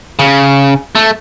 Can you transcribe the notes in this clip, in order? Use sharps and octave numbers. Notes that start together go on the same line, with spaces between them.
C#3
A3